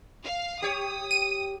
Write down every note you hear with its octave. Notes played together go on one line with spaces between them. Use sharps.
F5
G4 C#5 D#6
D#7